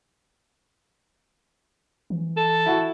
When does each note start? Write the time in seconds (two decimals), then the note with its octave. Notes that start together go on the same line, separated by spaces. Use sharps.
2.10 E3
2.37 A4
2.66 E4 F#4